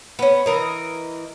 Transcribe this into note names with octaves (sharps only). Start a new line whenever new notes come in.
B3 C#4
E3 A#4 D#5